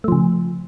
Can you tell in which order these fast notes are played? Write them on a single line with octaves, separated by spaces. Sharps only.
A3 F3 C#3